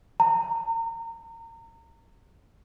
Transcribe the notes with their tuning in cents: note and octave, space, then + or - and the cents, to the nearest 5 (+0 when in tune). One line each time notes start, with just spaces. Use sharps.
A#5 -30